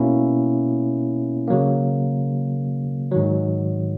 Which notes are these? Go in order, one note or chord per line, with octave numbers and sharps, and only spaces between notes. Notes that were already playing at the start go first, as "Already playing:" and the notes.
Already playing: B2 A#3 C#4 E4
C#3 F#3 A#3
G#2 D#3 F#3